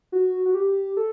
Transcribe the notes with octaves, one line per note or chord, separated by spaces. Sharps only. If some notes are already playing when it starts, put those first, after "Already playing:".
F#4
F#4
G4
A4